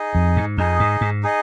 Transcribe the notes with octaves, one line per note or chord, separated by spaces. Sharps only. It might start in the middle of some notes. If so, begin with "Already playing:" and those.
Already playing: D#4 G#4 D#5
F2
G#2
F2 D#4 G#4 D#5
G#2
G#2
D#4 G#4 D#5